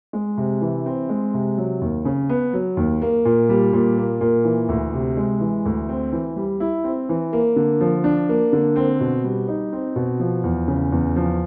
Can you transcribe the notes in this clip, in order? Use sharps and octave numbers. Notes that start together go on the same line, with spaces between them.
G#3
C3
E3
C4
G#3
C3
F#3
D#2
C#3
B3
F#3
D#2
A#3
A#2
G3
A#2
A#3
A#2
E3
D2
C3
G#3
E3
D2
C4
E3
G3
E4
C4
E3
A#3
D3
F3
D4
A#3
D3
C4
B2
G3
D#4
C4
B2
F3
E2
C#3
E2
F3